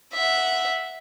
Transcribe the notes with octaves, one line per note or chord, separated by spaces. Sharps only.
E5 F#5